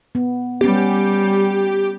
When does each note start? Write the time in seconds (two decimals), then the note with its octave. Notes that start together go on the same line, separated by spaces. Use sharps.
0.15 B3
0.61 G3 B3 C#4 G4